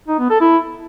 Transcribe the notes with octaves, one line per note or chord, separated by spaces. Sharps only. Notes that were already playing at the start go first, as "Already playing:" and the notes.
D#4
B3
A4
E4